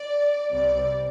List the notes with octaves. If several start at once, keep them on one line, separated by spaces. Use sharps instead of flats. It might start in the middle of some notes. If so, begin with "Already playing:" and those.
Already playing: D5
C2 C3 G3 C4 D5